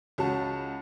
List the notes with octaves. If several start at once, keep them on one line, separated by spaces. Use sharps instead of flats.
C#2 C#4 F#4 A5